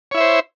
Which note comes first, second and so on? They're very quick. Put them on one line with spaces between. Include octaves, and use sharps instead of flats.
C#5 E4 E5 C5